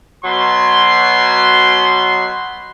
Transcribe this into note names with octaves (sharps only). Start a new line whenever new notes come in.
B2 F#3 C6